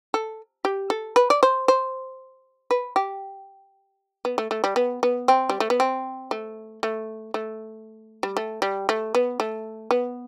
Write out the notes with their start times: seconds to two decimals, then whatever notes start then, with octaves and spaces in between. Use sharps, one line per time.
0.14 A4
0.65 G4
0.90 A4
1.16 B4
1.30 D5
1.43 C5
1.68 C5
2.71 B4
2.96 G4
4.25 B3
4.38 A3
4.51 A3
4.64 G3
4.76 B3
5.03 B3
5.28 C4
5.49 G3
5.60 A3
5.70 B3
5.80 C4
6.31 A3
6.83 A3
7.34 A3
8.23 G3
8.37 A3
8.62 G3
8.89 A3
9.15 B3
9.40 A3
9.91 B3